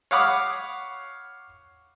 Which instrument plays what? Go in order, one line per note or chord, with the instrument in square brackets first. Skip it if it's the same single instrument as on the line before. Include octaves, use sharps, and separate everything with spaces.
[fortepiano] C#5 F5 F#5 B5 D6 D#6